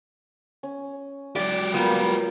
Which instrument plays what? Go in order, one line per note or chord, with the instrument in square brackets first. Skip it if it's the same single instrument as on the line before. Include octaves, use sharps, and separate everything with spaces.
[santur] C#4
[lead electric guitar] F#3 G4 [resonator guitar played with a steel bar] D5
[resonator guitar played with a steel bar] G3 B3 [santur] A#3 F4